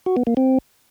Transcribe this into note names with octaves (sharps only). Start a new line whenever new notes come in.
F#4
B3
A#3
C4